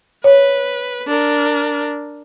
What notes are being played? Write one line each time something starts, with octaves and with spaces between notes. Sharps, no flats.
B4 C#5
D4 A#4